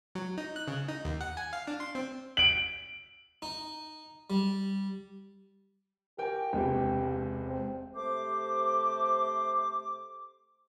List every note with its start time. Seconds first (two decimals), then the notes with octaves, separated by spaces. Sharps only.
0.15 F#3
0.38 D#4
0.56 F#6
0.68 C#3
0.88 D#4
1.05 D#2
1.21 F#5
1.37 G#5
1.53 F5
1.67 D4
1.80 C6
1.95 C4
2.37 D7 F#7
3.42 D#4
4.30 G3
6.18 G4 A#4 G5 G#5
6.53 E1 C#2 C3
7.47 C4
7.95 C3 A3 G4 C5 D6